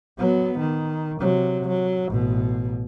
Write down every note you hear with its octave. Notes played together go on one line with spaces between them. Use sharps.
F#3 B3
D#3
C3 F#3
F#3
A1 B2